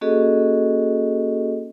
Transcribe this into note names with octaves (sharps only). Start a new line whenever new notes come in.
A#3 C#4 F#4 G#4 A4 D#5